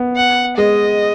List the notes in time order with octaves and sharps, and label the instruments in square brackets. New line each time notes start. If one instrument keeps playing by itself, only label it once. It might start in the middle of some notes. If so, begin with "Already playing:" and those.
Already playing: [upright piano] B3
[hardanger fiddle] F#5
[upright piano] G#3 [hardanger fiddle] D#5